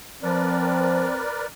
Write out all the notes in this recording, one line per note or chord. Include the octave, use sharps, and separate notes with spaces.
F3 C4 A#4 B4 D5